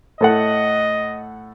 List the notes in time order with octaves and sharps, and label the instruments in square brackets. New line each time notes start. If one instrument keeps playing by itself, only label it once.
[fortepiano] A2 A4 F#5 [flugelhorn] D#5